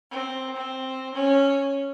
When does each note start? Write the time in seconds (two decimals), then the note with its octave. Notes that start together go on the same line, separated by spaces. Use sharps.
0.10 C4
0.54 C4
1.14 C#4